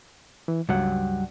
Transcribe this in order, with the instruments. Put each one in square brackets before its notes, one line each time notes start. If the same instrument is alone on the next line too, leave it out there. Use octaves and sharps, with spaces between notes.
[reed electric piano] E3
[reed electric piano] C#2 F#3 F#5 [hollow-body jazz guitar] G2